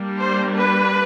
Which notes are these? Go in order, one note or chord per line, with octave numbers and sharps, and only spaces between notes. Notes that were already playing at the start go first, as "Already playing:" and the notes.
Already playing: G3 A#3 D4
C5
B4